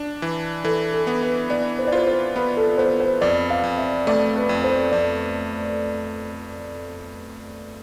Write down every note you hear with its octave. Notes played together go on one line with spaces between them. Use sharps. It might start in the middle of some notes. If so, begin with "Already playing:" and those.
Already playing: D4
E3
E3 A4
A4
B3
B4
B3 D5
C5
D5
F4 C5
C5
B3 B4
A4
B3 C5
C5
F2 D5
F5
F2
E5
A3 D5
B4
F2
C5
F2 D5